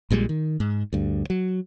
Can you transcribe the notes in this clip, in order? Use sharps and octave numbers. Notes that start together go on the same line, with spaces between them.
A#1 A#2 G3 G#3
D#3
G#2
D2 G2
F#3